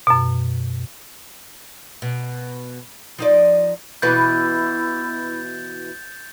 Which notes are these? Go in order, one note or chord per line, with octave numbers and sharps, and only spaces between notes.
F#2 B2
B2
F3 D#4 D5
B2 E3 B3 E4 G6 A6